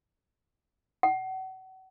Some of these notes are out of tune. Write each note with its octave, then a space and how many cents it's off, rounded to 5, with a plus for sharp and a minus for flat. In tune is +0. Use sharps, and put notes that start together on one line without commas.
F#5 +35